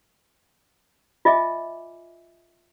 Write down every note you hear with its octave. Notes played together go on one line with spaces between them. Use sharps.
F4 D#5 E5 G#5 D6